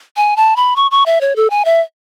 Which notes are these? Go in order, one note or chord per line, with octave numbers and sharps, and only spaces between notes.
G#5
A5
B5
C#6
C#6
E5
C#5
A4
G#5
E5